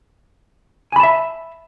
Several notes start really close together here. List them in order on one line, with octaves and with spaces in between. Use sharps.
G#5 B5 A5 E5